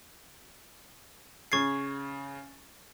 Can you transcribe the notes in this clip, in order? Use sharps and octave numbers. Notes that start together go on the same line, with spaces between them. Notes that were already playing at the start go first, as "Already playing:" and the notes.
C#3 C#6 G#6 A6 C7